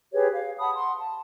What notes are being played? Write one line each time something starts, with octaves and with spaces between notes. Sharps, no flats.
G4 G#4 B4 C#5
F5
F#5 A5 B5 D#6
F#5 C6
A5